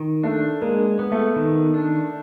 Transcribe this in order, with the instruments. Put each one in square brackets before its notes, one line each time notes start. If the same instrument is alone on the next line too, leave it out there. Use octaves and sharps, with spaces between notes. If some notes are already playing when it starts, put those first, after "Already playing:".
Already playing: [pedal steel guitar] D#3
[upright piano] A3 [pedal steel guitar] D4
[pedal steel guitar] G#3 [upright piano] A#3
[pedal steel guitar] B3
[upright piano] A3
[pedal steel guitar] D#3
D4